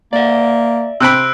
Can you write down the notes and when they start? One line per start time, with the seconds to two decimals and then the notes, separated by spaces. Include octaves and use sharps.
0.13 A#3 D5 E5
1.00 C3 C4 B5 E6 F#6 D7